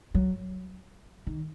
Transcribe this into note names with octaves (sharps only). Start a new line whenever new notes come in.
F#3
D#3